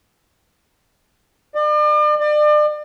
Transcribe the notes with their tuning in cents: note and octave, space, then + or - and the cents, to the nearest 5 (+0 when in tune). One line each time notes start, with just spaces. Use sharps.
D5 +40
D5 +35